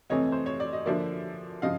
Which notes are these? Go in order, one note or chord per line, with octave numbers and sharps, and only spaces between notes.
F2 C3 E3 A3 C#5 D#5
C5
C#5
D5
D#5
D3 F3 A#3 D5 E5
C#3 F3 D#5 F5